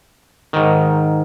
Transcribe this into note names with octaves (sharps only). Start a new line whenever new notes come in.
G#2 D#3